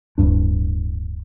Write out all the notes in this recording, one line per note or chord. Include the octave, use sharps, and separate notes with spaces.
D1 G1 G2 D4